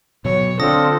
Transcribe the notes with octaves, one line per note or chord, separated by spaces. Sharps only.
B2 F#3 C#5
D3 C4 D4 F4 A4 D#6 A#6